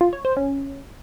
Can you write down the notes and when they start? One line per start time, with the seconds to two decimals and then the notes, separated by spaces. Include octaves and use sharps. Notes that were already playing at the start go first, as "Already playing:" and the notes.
0.01 F4
0.13 C#5
0.25 C5
0.37 C#4